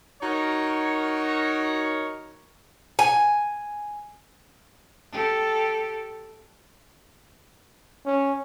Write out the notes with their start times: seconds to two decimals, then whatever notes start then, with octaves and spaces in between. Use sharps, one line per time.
0.21 D#4 F#4 A#4 C#5
2.99 G#5
5.12 G4 A4
8.05 C#4